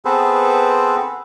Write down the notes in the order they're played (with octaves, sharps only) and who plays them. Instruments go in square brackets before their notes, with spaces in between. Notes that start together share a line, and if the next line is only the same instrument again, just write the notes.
[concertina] B3 C4 G#4 A4 B4 C5